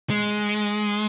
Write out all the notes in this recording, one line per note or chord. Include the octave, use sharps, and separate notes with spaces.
G#3